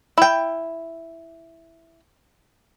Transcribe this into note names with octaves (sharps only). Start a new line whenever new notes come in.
E4 G5